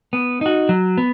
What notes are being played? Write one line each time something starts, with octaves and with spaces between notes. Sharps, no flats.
B3
D#4 F#4
F#3
B3